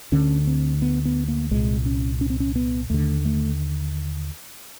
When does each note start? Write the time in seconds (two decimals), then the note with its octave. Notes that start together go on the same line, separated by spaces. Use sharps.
0.12 D2 D3 C#4
0.47 C4
0.82 B3
1.05 B3
1.28 A#3
1.51 C2 A#2 G#3
1.86 C#4
2.21 C#4
2.30 C4
2.40 C#4
2.56 B3
2.90 D#2 D3 A3
3.25 A3